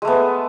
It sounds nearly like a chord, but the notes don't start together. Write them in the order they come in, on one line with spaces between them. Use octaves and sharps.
G#3 A3 B3